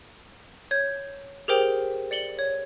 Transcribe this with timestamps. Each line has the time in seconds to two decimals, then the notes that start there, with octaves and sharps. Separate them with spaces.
0.71 C#5 G6 G#6
1.48 G4 G#4 A#4 C5 G5
2.11 D5 C#7 F#7 G7
2.39 C#5